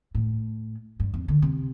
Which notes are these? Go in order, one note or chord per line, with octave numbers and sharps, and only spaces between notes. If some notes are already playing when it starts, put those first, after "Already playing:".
A2
G2
F2
D3
C3